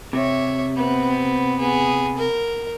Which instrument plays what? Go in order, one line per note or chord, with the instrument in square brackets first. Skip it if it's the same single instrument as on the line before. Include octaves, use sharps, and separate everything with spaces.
[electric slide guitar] C3 [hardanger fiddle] C#5 E5
[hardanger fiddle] B3 C4
B3 G#4
A#4